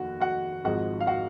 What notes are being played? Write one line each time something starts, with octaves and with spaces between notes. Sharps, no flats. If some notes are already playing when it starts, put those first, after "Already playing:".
Already playing: F1 D#2 F#4
F#4 F#5
G#1 G#2 F3 G#3 F#4 F#5
F5
F#4 F#5